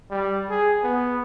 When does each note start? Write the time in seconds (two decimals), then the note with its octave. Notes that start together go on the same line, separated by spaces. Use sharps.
0.11 G3
0.50 G#4
0.83 B3